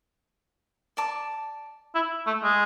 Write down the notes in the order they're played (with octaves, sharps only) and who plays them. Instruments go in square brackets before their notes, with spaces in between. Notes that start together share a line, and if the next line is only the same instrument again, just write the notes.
[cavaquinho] D5 A5 D6
[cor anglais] E4
A3
G#3